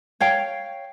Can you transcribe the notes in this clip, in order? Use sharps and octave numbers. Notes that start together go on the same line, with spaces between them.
C#5 F5 G5